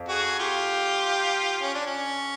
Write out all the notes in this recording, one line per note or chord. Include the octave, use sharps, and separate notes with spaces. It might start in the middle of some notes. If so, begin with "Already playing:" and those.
Already playing: F2
F#4 G#4
F4 G4
C#4
D4
C#4